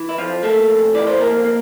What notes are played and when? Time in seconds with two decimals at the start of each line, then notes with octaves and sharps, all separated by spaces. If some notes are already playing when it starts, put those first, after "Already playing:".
Already playing: E3
0.09 E4
0.18 F2 F3 F4
0.43 A3 A#3 A4
0.68 F2
0.94 E3 D5
1.07 C5
1.19 F2 A#3 A#4
1.45 A#3